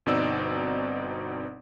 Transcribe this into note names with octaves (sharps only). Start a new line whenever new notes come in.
G1 B2 C4 D#4 D5 E6